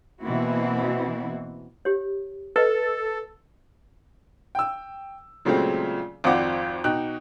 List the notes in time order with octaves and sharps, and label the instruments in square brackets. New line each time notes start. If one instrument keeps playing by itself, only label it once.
[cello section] B2 E3 A#3 C4 E4 F#4
[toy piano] G4 C#5
[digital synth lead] A4 [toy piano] B4 D#5
[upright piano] G5 E6
A#2 C#3 F#3 G#3 A3 C4
G#1 F2 C4 D5 F#5 D6
B2 D#4 G5 F#6